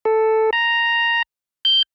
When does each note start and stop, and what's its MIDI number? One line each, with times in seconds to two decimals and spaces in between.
0.05 0.50 69
0.53 1.22 82
1.65 1.82 91